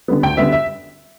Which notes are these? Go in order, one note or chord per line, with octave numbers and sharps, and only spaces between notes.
D3 G3 B3
D2 G5
D3 G3 B3 E5
E5